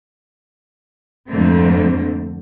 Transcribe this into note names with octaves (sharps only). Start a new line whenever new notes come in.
F2 G#2 D3 A3 A#3 C4